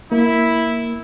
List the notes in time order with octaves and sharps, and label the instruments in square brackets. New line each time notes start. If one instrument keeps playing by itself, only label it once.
[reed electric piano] A#3 [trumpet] E4